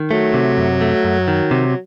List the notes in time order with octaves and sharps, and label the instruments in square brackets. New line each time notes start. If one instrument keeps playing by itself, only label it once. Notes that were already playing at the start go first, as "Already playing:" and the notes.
Already playing: [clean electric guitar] D#3
[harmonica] F#3 [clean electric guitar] A3
[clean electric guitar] C3
F#2
A3
F#2
D#3
C3